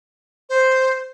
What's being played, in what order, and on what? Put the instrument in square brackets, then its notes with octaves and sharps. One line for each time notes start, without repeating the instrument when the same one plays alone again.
[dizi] C5